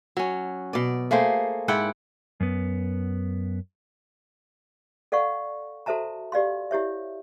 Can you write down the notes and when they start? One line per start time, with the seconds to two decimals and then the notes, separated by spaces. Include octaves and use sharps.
0.17 F#3 C#4
0.73 B2 D5
1.11 A3 A#3 G#4 C5
1.68 G#2 E4 F#5 G5
2.40 F#2 B3
5.12 A4 D5 F5 F#5 C#6
5.86 F#4 A4 C5 E5 A5 A#5
6.32 G4 D5 F5 C6
6.71 E4 G4 C#5 E5